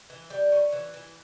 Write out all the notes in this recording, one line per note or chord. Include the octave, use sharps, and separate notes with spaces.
E3
G3
C#4
E3
E3